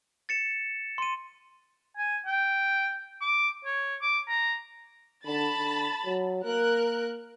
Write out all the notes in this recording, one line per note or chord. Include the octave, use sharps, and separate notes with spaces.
A6 C#7 E7
C6 D#7
G#5
G5
D6
C#5
D6
A#5
D3 A5 B5 A6
D3
F#3
A#3 A#4 F#6